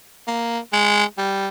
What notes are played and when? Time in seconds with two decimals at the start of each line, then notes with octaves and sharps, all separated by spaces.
0.27 A#3
0.72 G#3
1.18 G3